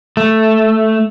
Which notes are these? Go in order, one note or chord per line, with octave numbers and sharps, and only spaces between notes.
A3